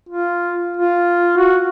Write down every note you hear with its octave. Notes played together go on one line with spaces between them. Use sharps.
F4
F4
F#4